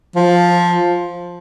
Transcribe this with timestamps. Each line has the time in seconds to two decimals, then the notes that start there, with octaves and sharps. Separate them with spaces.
0.15 F3